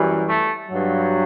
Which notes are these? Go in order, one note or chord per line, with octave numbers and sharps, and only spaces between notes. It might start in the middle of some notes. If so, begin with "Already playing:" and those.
Already playing: F#2 E3 G3
A3
G2 F#3